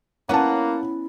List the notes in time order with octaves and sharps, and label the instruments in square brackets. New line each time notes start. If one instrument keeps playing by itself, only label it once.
[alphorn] A#3 [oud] B3 C#4 [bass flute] E4 [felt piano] F#5 A5